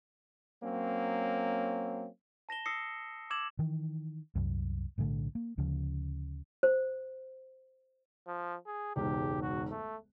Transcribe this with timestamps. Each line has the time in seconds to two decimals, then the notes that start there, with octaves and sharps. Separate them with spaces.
0.63 F#3 A#3 C4 C#4
2.49 A5 A#6 E7 G7
2.66 D#6 E6 A#6 C7 C#7
3.31 D6 E6 G#6 E7 F#7
3.59 D#3 E3
4.35 C2 F#2
4.98 B1 A2 D3 A3
5.35 A#3
5.58 D2 C#3 F3
6.63 C5
8.27 F3
8.66 G#4
8.96 E1 C#2 G#2 G4
9.42 F#4
9.71 A3